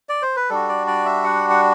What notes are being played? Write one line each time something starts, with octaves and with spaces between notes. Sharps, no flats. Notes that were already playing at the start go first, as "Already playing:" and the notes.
D5
C5
B4
G3 D4 F#4 A4
D5
D5
E5
F#5
F#5